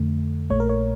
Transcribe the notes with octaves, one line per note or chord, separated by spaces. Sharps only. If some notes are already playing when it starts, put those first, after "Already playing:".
Already playing: F2 D3 A3
A#1 A#2 A3 C#5
A#4
C#5